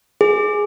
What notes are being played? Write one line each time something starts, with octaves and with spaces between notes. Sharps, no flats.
G#4